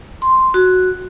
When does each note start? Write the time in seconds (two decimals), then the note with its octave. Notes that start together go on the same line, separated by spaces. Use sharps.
0.22 C6
0.54 F#4